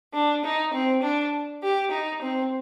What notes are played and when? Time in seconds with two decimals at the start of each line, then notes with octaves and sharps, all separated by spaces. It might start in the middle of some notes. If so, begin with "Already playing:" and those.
0.13 D4
0.43 D#4
0.72 C4
1.02 D4
1.62 G4
1.91 D#4
2.21 C4